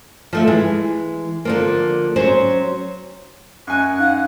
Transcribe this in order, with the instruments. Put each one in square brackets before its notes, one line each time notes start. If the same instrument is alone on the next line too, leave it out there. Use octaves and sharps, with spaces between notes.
[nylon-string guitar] F3 A3 E5
E3 G#3
D3 F3 A#3
F#3 C#4 C5
[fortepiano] F#2 G#5 [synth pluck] C#6 [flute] F#6
[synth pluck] D#4 F#5 [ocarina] F5